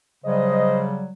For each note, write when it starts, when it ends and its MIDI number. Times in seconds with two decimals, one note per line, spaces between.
0.25 1.10 49
0.25 1.10 54
0.25 1.10 55
0.25 0.83 72
0.25 0.83 75